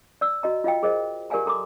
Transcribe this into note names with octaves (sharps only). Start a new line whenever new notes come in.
D5 E6
F#4 D#5 A#5
F4 D#5 F5 G5
G#4 A#4 C5 D#5
G4 A#4 D5 F5 G#5 A#5
A4 A#5 C6 D6